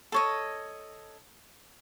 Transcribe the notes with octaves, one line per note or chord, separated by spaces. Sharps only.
A4 C#5 D#5